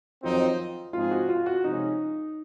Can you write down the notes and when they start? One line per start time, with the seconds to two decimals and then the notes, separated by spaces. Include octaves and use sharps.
0.23 F2 D#3 F#3 C4 D#4 F4
0.93 G#2 F3 C4 D#4 F4 G#4
1.11 F#4
1.29 F4
1.46 F#4
1.64 C3 F3 G#3 C#4 D#4